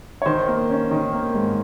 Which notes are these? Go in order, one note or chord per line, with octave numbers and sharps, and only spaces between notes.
C#5
D#3 C5
A#3
C#4
D#3
A#3
G#2